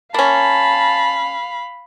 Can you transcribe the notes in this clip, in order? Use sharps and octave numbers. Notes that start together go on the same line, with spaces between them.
A#3 C#4 F5 A5 B5